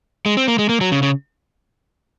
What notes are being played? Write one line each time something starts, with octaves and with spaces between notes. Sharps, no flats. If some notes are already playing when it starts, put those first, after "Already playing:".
G#3
C4
A#3
G#3
A#3
F#3
C#3
C#3